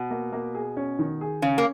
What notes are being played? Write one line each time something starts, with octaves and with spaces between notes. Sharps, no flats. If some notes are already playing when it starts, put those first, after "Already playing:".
Already playing: B2
A#3
A#3
G#4
C#4
D#3
G#4
C#3 C#4
A#3